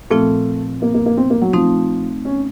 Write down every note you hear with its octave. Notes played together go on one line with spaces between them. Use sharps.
A#2 F3 A3 C4 F4
A#3
A#3
A#3
C4
A#3
F#3
F3 A3 C4 D#4
C#4